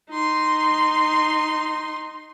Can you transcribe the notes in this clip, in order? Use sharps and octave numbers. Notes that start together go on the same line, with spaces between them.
D#4 C6